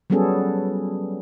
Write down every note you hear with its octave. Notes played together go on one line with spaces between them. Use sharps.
F#3 G3 B3 C#4 G#4 A4